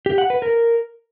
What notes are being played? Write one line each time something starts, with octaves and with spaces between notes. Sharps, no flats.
G4
F#5
B4
A#4